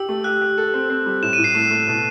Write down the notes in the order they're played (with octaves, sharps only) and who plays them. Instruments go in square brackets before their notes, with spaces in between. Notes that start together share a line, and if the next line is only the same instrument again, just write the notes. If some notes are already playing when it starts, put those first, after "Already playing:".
Already playing: [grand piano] G4 [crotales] E6
[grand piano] A3
[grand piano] G4 [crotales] F#6
[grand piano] G4
A4
C4
C4
G3
[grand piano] A2 [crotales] E7
[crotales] D#7
[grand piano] A2
[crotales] C7
[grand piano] A3 [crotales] E7
[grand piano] A3
B2